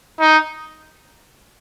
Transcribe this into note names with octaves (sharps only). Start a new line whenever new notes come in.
D#4